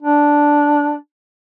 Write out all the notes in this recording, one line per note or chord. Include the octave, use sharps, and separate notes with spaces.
D4